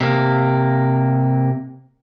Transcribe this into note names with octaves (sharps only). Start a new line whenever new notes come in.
C3 A#3